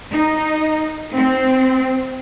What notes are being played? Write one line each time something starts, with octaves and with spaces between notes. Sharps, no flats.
D#4
C4